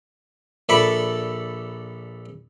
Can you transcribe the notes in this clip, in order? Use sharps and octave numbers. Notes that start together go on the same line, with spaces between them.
A#1 A4 D5 E5 B5